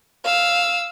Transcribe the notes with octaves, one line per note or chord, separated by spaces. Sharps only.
F5 E6